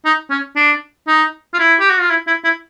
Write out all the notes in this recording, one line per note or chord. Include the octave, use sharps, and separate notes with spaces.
D#4
C#4
D4
D#4
F4
E4
G4
F#4
F4
E4
E4
E4